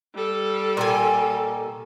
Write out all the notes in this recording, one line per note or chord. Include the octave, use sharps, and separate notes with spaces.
G3 A4
A#2 D#3 G#5